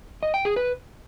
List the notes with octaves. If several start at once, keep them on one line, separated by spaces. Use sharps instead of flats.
D#5
G5
G#4
B4